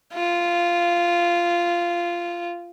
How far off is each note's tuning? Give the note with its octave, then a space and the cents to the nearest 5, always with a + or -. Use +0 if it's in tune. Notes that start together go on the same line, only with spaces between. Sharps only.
F4 -10